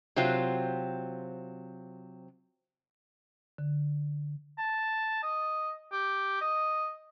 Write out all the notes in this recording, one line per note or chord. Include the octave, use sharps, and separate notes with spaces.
C3 F#3 C4 F4
D3
A5
D#5
G4
D#5